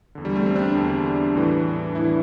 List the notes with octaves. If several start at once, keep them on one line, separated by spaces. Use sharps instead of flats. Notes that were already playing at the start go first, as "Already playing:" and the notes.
E2 D3
G3
A3
C4
D4
E2 D3
A2 E3
A2 E3 E4